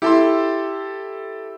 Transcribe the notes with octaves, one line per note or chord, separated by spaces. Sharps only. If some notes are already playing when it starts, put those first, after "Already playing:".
E4 G4 A4 C6